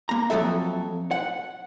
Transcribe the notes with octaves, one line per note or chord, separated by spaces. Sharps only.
A#3 A#5
F2 F3 F#3 A4 E5
F#5